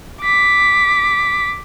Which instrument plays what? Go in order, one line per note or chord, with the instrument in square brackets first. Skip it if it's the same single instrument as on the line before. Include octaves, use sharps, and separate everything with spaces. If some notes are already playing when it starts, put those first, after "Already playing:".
[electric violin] D6 B6